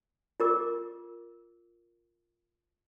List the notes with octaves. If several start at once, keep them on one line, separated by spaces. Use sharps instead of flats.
F4 A#4 D6